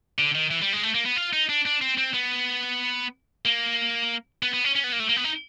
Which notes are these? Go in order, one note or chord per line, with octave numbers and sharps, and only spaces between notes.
D3
D#3
E3
G3
G#3
A3
A#3
B3
F4
D#4
D4
D4
C4
C4
B3
A#3
B3
B3
C#4
C#4
B3
A#3
A3
A#3
B3
D#4